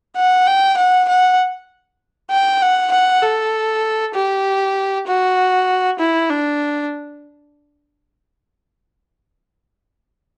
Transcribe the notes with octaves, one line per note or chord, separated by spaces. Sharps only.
F#5
G5
F#5
F#5
G5
F#5
F#5
A4
G4
F#4
E4
D4